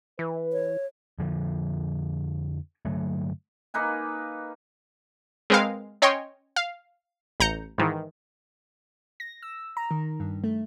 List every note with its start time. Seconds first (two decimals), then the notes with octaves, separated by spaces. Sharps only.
0.19 E3 B4
0.53 C#5
1.19 F2 D3 F3
2.85 G2 D3 F#3 A3
3.74 A#3 D#4 B4 G#5
5.50 G#3 C4 A#4 B4 F5
6.02 C#4 C#5 D#5 G5 C6
6.56 F5
7.40 A1 A#5 G6 C#7
7.78 G#2 D#3 E3
9.20 A#6
9.42 E6
9.77 A#5
9.91 D#3
10.20 G2
10.44 A3